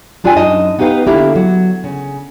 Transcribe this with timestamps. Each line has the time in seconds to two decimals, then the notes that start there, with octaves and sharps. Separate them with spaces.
0.24 G3 D4 F4 D5 G5 G#5
0.36 F#2 D#4 D#5 A5
0.79 B3 D#4 G4 B4 F5
1.06 D3 A#3 D4 E4 G4 A4
1.36 F#3
1.84 C#3